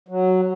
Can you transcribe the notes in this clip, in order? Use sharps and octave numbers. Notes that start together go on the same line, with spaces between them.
F#3